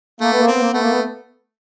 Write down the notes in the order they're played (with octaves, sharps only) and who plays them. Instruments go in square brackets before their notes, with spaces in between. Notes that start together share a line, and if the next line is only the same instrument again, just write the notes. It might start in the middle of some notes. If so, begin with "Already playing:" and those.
[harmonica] A3 [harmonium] A#3
[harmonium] B3
A#3
[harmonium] B3 [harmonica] C4
[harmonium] A#3
[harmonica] A3 [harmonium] B3
[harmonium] A#3
B3